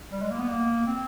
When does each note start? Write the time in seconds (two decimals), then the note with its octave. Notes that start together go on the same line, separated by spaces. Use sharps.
0.12 G3
0.22 G#3
0.31 A#3
0.39 B3
0.49 A#3
0.87 C4